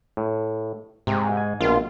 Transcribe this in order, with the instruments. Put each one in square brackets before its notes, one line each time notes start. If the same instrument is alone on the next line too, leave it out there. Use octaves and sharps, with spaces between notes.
[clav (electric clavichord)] A2
[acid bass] G#2 [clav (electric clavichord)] C3
[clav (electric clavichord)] G#5
[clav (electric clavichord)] A#1 B2 [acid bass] F4